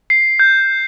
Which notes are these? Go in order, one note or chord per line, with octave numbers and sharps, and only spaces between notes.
C7
G6